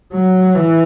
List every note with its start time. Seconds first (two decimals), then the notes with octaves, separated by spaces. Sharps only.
0.13 F#3
0.54 E3